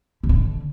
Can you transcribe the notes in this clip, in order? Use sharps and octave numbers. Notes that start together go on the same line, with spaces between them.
B2
C3
D3